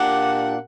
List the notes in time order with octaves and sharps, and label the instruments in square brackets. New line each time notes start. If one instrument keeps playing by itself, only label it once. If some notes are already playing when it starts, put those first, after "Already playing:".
Already playing: [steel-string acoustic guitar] A#2 A#3 D4 G4 [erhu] F#5